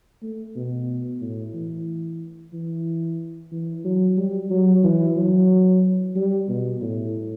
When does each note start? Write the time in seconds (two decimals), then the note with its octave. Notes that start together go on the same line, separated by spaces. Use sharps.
0.22 A3
0.56 B2
1.22 A2
1.54 E3
2.53 E3
3.52 E3
3.85 F#3
4.17 G3
4.51 F#3
4.84 E3
5.17 F#3
6.16 G3
6.49 B2
6.82 A2